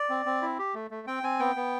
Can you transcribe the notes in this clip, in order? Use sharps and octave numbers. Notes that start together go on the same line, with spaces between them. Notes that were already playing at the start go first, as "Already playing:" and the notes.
Already playing: D5
C4
C4
E4
G4
A3
A3
C4 G5
C4 G#5
B3 G5
B3